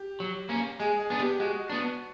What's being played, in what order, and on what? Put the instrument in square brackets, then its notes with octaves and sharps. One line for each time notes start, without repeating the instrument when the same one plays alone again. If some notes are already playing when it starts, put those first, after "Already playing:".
Already playing: [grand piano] G4
[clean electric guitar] F#3
A#3 C#4
[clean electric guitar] G#3 [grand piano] G#4
[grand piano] G#4
[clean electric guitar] B3 D4
[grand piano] G4
[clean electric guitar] G#3 [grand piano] F#4
[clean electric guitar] B3 D4